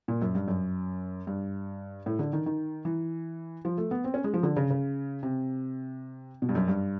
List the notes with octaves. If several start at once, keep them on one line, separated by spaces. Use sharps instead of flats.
A#2
F#2
G2
F#2
G2
A2
D3
D#3
D#3
E3
F3
A3
B3
C4
C#4
G#3
F3
D3
C#3
C#3
C3
B2
G2
F#2
G2